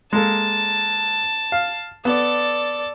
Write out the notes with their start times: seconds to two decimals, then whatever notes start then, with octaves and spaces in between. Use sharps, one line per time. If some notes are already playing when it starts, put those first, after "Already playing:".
0.13 G#3 A#3 A4 A5
1.52 F5
2.05 B3 A4 D5